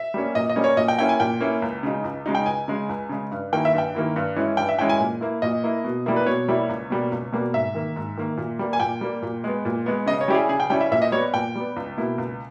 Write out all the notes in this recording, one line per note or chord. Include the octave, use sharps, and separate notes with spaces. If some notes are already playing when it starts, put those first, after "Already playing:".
Already playing: E5
G3 A#3 C#4
A#2 D#5
D#5
G3 A#3 C#4
C#5
A#2 D#5
G5
A#3 C#4 E4 G5
G#5
A#2 G5
A#3 C#4 E4
C#2
C#3 G#3 D#4
C#2
C#3 G#3 D#4
G5
C#2 G#5
C#3 G#3
C#2
C#3 G#3
G2
D#3 A#3 E4 G5
E5
G2 G5
D#3 A#3 E4
G2
E3 G#3 C#4 E4
G2 G5
E5
E3 G#3 C#4 E4 G5
G#5
A#2
A#3 E4
A#2 D#5
A#3 E4
B2
G3 A#3 E4
B4
B2 C#5
G3 A#3 E4
C#2
B2 G3 A#3
C#2
B2 G3 A#3
G#2 E5
D#3 A#3
G#2
D#3 A#3
A#2
G3 A#3
G#5
A#2 G5
G3 A#3
A#2
G#3 B3
A#2
G#3 B3
C#3 D#5
C#5
G3 C#4 E4 G4
G#4
C#3 G#4
G5
G3 C#4 E4 G5
E5
A#2 E5
D#5
G3 B3 C#5
A#2 G5
G3 B3
C#2
B2 A#3 E4
C#2